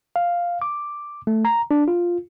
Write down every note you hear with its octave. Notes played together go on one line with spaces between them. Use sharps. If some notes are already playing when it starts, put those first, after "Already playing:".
F5
D6
A3
A#5
D4
F4